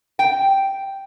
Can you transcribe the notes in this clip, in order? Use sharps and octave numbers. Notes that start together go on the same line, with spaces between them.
G5